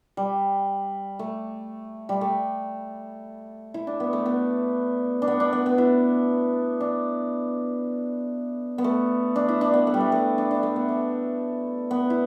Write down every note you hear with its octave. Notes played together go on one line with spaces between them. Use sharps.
G3
A3
G3
A3
E4
D4
B3
A3
B3
D4
B3
D4
B3
B3
E4
D4
B3
A3
D4
E4
D4
B3
A3
G3
A3
A3
D4
D4
A3
B3
A3
B3
E4